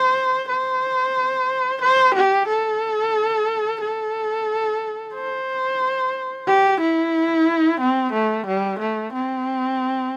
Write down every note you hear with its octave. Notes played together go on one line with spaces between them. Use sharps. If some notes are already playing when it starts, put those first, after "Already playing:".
Already playing: C5
C5
C5
G4
A4
A4
C5
G4
E4
C4
A3
G3
A3
C4